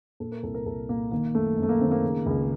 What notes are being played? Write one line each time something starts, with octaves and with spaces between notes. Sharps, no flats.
A#2 A4
A#4
C2 A4
A#4
C2 A4
A#2 A#3
D#3 A#3
F#2 A3
F#2
A3
A#3
D#3 C4
A#3
C#3
C#2